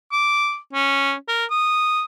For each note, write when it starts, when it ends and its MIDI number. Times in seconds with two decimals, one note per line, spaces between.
0.12 0.57 86
0.73 1.14 61
1.28 1.45 70
1.50 2.03 87